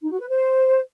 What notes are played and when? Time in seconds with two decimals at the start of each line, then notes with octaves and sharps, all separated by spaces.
0.02 D#4
0.11 F#4
0.20 B4
0.29 C5